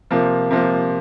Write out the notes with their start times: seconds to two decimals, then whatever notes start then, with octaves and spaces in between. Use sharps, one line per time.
0.11 C3 F3 A#3
0.51 C3 F3 A#3